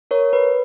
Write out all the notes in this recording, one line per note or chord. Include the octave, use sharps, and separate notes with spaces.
A#4 C#5
B4